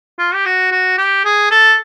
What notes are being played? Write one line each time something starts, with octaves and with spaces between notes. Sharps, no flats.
F4
G4
F#4
F#4
G4
G#4
A4